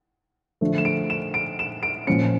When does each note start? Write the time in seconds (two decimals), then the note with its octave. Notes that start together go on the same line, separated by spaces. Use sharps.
0.61 D3 F3 A3 D4
0.78 E7
0.85 D7
1.10 E7
1.34 D7
1.59 E7
1.83 D7
2.07 A#2 F3 C#4 C#7